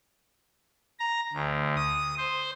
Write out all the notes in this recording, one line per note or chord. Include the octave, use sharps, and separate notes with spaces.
A#5
D2
D#6
C5